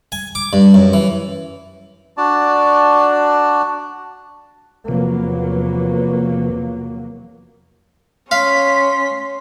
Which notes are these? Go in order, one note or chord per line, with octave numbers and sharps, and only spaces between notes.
G#5
D6
G2
F#2
E3
D4 F#4 D5 A5
E2 C3 F3 F#3 A#3 B4
C#4 F5 C6 B6